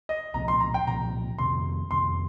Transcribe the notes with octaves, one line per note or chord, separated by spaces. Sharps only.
D#5
C2 A#2 F3 C4 A#5
C6
A#5
G5
C2 A#2 F3 C4 A#5
F2 C3 D#3 C4 C6
F2 C3 D#3 C4 C6